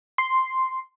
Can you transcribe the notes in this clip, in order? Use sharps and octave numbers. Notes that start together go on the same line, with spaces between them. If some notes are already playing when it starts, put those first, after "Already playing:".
C6